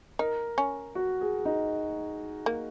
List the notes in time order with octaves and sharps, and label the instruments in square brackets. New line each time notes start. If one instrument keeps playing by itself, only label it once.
[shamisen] D#4 [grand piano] A#4
[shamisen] C#4
[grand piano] F#4
G#4
D#4
[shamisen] A#3